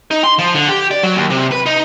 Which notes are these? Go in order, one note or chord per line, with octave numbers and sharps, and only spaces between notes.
D#4
C6
F3
D3
G4
D5
F#3
D#2
C3
B4
D#4